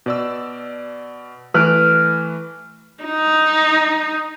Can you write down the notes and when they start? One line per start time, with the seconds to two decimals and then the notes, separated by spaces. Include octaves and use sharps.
0.06 B2 D5 E6
1.54 E3 A3 B4 F6 F#6 D7
3.04 D#4